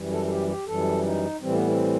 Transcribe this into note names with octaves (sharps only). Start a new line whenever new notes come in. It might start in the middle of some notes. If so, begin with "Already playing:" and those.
Already playing: F#2 E3 G3
A4
A4
G4
G4
F#2 E3 G3 A4
D#4
A2 E3 G3 C4
B3
C4